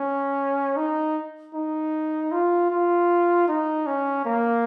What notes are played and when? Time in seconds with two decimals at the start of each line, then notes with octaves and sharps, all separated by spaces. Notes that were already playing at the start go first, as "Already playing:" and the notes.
Already playing: C#4
0.76 D#4
1.54 D#4
2.32 F4
2.70 F4
3.48 D#4
3.86 C#4
4.25 A#3